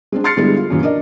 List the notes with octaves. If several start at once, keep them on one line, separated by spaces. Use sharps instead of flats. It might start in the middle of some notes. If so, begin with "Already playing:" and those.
G#3 C4 D4
C6 F6 A6 C7 C#7
D3 G3 G#3 B3 E4
F4
F#2 A#2 C#3 E3 F#3
D4 A#4 D5 D#5